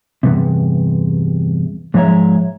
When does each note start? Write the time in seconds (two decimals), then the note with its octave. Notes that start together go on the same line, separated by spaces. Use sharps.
0.23 E2 G2 C3
1.94 G#2 F3 G#3 C#5 E5 A#5